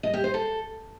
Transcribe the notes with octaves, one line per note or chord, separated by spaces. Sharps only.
D#5
G4
C5
A4